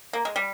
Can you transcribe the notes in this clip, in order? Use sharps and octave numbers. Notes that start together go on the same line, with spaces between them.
A#3
G#3
G3